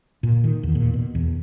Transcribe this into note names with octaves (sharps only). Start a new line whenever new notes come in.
A#2
D#3
E2
A#2
B2
E2